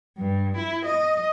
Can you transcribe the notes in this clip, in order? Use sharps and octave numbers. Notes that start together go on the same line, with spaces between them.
G2
E4
D#5